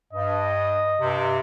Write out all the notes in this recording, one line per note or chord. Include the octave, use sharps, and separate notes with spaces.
G2 D#5
G2 C3